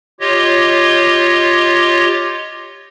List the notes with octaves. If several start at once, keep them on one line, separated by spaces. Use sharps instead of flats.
F4 G4 C#5 D#5